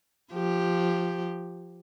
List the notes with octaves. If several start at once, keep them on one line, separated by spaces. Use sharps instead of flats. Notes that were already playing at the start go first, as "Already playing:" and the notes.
F3 G4